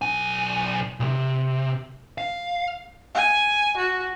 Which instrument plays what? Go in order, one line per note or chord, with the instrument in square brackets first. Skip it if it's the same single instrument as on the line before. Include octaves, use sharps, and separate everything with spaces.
[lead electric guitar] B1 G#5
B1 C3
F5
[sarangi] G#5
F#4